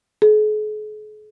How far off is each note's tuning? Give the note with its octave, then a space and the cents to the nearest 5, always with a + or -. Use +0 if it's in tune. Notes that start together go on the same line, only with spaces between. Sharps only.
G#4 +45